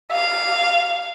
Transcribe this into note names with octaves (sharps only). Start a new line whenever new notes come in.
F5